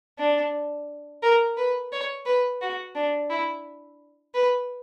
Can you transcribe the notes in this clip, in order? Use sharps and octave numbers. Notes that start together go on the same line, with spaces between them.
D4
A#4
B4
C#5
B4
F#4
D4
E4
B4